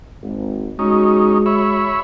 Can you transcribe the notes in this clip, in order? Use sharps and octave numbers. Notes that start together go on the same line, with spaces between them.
G#1
G#3 C#4 D#4 F#4
C#5 E5 B5